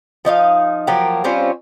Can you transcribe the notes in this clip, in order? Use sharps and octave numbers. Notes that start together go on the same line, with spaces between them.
F3 D#4 C#5 F5
F3 F#3 A#3 G4
G3 C4 C#4 F4